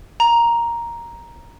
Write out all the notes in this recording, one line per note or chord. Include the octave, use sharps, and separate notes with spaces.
A#5